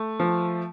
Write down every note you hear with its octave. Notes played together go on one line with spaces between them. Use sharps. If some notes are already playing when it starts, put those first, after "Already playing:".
Already playing: A3
F3